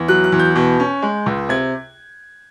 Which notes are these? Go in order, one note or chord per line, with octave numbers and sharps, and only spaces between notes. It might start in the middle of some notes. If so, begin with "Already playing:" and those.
Already playing: E2
F#3 F#6
F#6
E2
G6
B2
C#4
G#3
C#2
C3 G#6